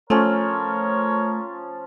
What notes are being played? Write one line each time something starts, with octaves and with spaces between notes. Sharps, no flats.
F3 A3 C#4 A#4 C#5